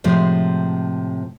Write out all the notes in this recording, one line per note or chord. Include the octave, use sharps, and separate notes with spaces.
A2 C3 F3 G#3